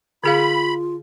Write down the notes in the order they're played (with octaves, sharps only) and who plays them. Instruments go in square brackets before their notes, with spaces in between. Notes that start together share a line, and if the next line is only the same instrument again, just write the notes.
[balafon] D3 G#4 F5 [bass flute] F4 [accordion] B5